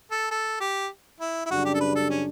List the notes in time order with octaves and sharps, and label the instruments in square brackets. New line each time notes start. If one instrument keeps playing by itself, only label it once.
[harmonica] A4
A4
G4
E4
E4
[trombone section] F#2 C#3 G3 D4 [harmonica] F#4
[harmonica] G4
A4
B4
A4
C#4